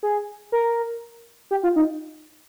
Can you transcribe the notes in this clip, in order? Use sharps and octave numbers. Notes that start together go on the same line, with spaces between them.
G#4
A#4
G4
F4
D#4